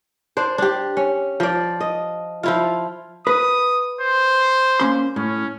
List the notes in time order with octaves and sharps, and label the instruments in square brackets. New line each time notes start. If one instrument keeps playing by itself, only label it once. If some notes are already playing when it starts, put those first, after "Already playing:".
[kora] D4 C5
D4 G4
C#4
F3 D5
D#5
F3 E4 F4
[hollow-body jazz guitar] B4 [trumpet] D#6
[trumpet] C5
[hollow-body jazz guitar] A#3 C#4 C6
[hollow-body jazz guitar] A2 [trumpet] C#4